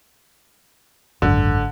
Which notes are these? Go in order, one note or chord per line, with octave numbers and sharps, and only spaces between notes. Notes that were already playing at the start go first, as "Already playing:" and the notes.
G#1 C#2 F#2 D3